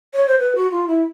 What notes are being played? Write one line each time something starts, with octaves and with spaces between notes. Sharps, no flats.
C#5
C5
B4
F#4
F4
E4